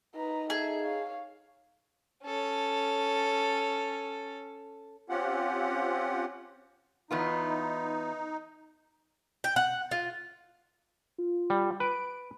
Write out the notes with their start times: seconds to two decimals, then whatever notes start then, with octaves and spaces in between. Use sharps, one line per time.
0.16 D#4 B4 A#5
0.50 G#4 A4 E5
0.82 C#5 F5
2.24 C#4 A4
5.09 C4 C#4 F4 G4 F#5
7.11 E2 B3 D#4 F4
9.44 G5
9.56 F#5
9.91 F4
11.18 F4
11.50 G3
11.80 B4 D7